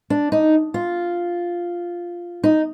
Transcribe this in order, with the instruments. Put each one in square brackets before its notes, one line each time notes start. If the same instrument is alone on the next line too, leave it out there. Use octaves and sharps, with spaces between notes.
[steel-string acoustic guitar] D4
D#4
F4
D#4